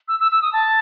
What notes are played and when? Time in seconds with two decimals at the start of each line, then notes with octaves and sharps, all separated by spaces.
0.08 E6
0.20 E6
0.31 E6
0.42 D#6
0.53 A5